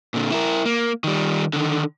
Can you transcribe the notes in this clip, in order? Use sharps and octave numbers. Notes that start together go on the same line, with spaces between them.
A#2 D3
E4 A#4
A#3
D#3 G3
D3 D#3